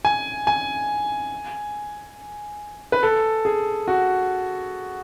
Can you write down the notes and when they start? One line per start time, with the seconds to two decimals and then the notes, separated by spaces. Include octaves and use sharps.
0.05 G#5
0.47 G#5
2.92 B4
3.03 A4
3.45 G#4
3.88 F#4